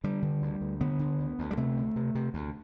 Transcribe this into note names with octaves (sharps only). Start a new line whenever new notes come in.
D3 G3
D3
D2
D2
D3 B3
D3
D2
D2
G3
C3 A3
D2
C3
C3
D2